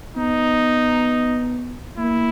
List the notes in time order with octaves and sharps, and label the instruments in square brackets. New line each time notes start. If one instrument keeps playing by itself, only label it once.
[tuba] B3 [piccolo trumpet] D#4
[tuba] A#3 [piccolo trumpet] E4